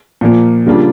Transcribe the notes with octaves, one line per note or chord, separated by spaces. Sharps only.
A#2 F3 A#3
C#3 G3 A#3 D4 F4